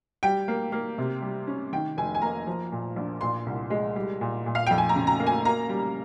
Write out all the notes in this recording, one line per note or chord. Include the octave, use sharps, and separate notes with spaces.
G3 G5
A#3
A#3
C3
G3
C#4
D#3 G5
F1 G#5
G#5
A#3 A#5
F3
A#2
A#1
A#2 C6
C2
G#3
G3
A#2
A#2
F5
F2 G5
G#5
A#5
C#3
A#5
A#3
G#5
A#3 A#5
G3